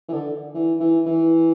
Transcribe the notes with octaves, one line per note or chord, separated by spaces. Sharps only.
E3
D3
E3
E3
E3